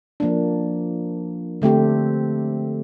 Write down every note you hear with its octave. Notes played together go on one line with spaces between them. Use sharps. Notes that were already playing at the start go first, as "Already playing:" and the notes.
F3 A#3 D4
D3 A3 C4 G4